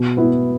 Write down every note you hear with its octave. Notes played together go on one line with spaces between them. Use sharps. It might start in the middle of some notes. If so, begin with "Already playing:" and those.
Already playing: B2
B3 E4